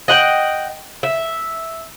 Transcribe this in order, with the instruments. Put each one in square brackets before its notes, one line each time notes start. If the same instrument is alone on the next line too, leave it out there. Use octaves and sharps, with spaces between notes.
[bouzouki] D#5 F#5 G5
E5